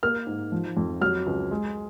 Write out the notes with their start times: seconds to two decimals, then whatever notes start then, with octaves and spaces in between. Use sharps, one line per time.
0.03 A#3 F6
0.27 G#2
0.52 F3
0.77 F2
1.01 F#3 F6
1.26 C#2
1.51 G#3